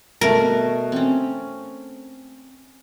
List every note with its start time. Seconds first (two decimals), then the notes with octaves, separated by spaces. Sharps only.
0.21 B2 A3 A#4
0.92 C4 C#4